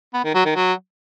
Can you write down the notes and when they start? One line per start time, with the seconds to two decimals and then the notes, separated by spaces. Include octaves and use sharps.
0.14 B3
0.24 D#3
0.35 F#3
0.45 D#3
0.56 F#3